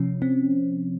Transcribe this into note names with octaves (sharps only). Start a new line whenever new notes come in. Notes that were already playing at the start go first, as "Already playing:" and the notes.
Already playing: C3 F3 C#4
C4